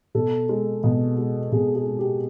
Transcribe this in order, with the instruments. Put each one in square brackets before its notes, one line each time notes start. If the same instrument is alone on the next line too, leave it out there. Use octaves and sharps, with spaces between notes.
[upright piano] B2 A4
G#3
B2
G#3
B2 G#4
G#4
G#3
G4